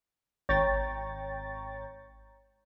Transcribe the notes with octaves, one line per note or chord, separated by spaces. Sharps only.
G#1 C#5 G5 A#5 C#6 A6